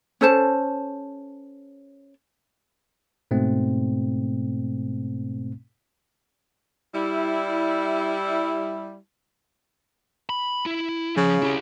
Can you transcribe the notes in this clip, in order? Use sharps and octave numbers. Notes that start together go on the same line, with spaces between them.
C#4 A4 C5 A5
G#2 B2 A3 C4
G3 E4
B5
E4
C#3 F3
E4 G4